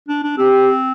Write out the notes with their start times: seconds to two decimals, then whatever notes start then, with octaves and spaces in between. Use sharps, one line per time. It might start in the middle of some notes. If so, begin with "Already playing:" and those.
0.09 D4
0.23 D4
0.38 C4 G4